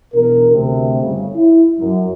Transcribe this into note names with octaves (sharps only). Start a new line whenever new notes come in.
E2 B2 D4 A#4
D2 C3
G1 C#3
E4
F#2